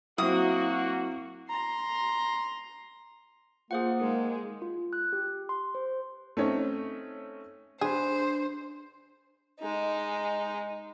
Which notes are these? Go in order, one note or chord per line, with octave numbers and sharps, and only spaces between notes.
F#3 A#3 C4 E4 F#4 D#6
A#5 C6
A#3 F4 G#4 C5 F#5
D#3 G#3
F4
F#6
G4
C6
C5
A3 C4 C#4 D#4 C#5
D4 G#4 B4 C5
G#3 D#4